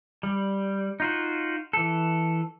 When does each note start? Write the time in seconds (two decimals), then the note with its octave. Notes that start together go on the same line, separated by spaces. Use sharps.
0.23 G3
1.00 D#4 F4 F#4
1.73 E3 A4